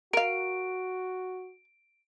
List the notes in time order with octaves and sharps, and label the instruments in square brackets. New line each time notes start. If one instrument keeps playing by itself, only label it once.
[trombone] F#4 [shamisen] A#4 F5 [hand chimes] D7